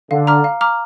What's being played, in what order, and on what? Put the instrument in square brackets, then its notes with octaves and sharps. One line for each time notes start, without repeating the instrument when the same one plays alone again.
[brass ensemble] D3 [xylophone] F5
[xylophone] A#5 D6 F6
F5
A#5 D6 F6